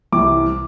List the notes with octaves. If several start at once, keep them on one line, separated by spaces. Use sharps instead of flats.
C2 C3 E3 G3 D6